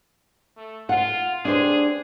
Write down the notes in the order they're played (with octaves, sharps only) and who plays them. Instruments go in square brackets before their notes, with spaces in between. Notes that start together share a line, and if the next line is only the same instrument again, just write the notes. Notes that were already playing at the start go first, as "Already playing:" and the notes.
[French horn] A3
[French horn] F4 [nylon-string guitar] F#5
[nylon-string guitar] D4 G4 C5 [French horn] G#4